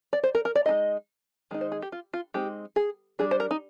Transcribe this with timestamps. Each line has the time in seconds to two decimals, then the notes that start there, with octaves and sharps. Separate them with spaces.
0.13 D5
0.24 C5
0.35 A#4
0.45 A#4
0.55 D5
0.66 G#3 C4 D#4 D#5
1.51 D#3 G#3 D#4
1.61 C5
1.72 G#4
1.82 G4
1.92 F4
2.13 F4
2.34 G#3 C4 D#4 G4
2.76 G#4
3.19 G3 D4 G#4
3.31 C5
3.40 A#4
3.51 D#4